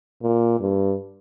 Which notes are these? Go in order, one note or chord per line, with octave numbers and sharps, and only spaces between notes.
A#2
G2